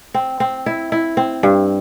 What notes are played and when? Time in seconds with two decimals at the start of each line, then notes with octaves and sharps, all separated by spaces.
0.14 C4
0.40 C4
0.66 E4
0.92 E4
1.17 C4
1.43 G2